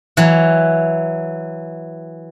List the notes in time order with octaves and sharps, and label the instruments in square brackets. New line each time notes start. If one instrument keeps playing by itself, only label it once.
[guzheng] E3 F#3